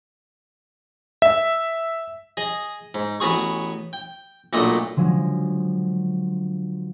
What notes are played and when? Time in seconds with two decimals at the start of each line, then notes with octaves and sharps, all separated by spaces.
1.22 E5
2.37 G#4 D#5
2.94 G#2
3.20 A1 B3 F#4 G#4 C#6
3.93 G5
4.53 B1 A#2 A3 D4 D#5
4.96 D3 F3 F#3 G#3